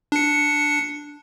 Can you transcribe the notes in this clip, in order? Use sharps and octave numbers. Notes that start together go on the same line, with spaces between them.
D4 C#7